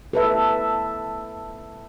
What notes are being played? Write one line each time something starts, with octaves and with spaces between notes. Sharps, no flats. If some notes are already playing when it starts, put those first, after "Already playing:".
A4 B4 E5